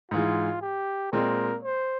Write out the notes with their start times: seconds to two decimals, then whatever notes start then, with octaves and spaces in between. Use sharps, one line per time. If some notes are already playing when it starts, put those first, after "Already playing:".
0.11 G#2 E3 G#3 F4
0.62 G4
1.12 A#2 G#3 C4 A#4
1.63 C5